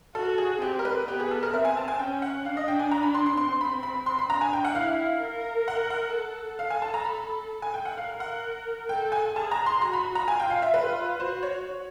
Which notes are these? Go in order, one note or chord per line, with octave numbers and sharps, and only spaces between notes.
F#4 A4
G#4
C4 G4
A#4
B4
B3 G4
G#4
A4
A#4
C4 E5
G#5
A5
G#5
C#4 G5
F#5
D4 F5
D#5
G5
G#5
A#5
B5
C6
C6
C4 C6
B5
B5
C6
B5
D4 A#5
G#5
G5
F#5
E4 F5
A#4
F#5
F#5
A4
F5
G#5
A5
A#5
B5
G#5
G5
F#5
A#4 F5
F#5
A4 G5
G#5
G#4 A5
A#5
C6
F#4 A#5
B5
A#5
F4 G#5
G5
F5
E5
F4 B4
F#4 C5
C#5